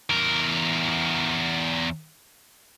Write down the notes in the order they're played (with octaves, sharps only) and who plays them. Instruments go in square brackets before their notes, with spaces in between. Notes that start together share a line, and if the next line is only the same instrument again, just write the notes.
[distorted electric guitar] E2 A#4